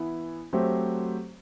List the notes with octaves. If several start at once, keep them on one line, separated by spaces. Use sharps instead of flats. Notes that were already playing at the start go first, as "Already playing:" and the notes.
Already playing: E3 B3 E4
F#3 A3 C4 G4 C5